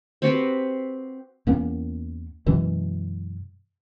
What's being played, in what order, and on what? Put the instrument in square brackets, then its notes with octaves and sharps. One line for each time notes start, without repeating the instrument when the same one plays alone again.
[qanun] C4 F#4 G4 B4
[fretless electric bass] E2 A#3 B3 C#4
F#2 B2 E3 G#3